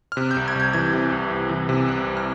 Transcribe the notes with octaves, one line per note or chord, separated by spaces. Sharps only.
F6
C3 F#6
G6
C2
G#6
C2 G6
E3 G#6
C3
C2
C2
E3
C3
C2 F#6
C2
F6